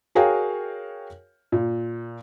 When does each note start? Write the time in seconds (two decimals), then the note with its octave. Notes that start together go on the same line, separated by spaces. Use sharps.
0.15 F#4 G#4 A#4 C#5 F5 G5
1.52 A#2